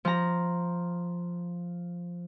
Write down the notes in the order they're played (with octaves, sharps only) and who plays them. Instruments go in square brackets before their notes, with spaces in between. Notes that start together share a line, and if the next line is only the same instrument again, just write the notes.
[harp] F3 A#5